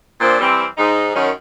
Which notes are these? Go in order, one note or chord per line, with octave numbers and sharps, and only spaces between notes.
A#2 F3 C4 D4
E3 G3 C4
G#2 D#4
F#2 D#3 F#3 C#4